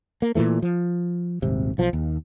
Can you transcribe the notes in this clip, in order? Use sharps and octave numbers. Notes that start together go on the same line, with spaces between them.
A#3
A#2 C#3 E3 A3
F3
D#1 G#1 C3
B1 F3
D#2